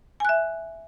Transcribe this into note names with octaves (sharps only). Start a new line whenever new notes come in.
E5 G#5 F#6